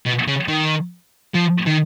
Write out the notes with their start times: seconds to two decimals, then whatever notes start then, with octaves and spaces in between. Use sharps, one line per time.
0.06 B2
0.28 C#3
0.49 D#3
1.34 F3
1.66 D#3